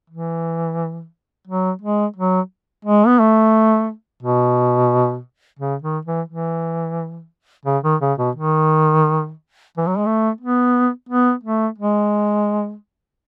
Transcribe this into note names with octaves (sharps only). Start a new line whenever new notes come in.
E3
F#3
G#3
F#3
G#3
B3
A3
B2
C#3
D#3
E3
E3
C#3
D#3
C#3
B2
D#3
E3
F#3
G#3
A3
B3
B3
A3
G#3